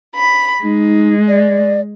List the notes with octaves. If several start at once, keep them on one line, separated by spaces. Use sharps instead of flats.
B5
G#3 D#4
D5